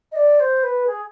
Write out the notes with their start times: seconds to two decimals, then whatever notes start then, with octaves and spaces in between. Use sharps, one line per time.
0.12 D#5
0.16 D5
0.40 C5
0.63 B4
0.87 G#4